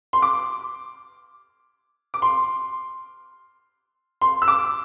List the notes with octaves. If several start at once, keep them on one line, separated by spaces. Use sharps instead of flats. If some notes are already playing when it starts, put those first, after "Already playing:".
C6
D6
D6
C6
C6
E6
D6